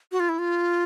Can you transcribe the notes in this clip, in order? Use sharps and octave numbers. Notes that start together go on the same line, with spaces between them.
F#4
F4
E4
F4